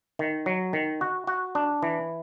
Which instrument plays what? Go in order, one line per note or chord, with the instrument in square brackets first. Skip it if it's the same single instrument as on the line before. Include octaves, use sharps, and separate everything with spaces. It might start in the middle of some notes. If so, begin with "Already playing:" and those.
[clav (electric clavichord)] D#3
F#3
D#3
F#4
F#4
D4
E3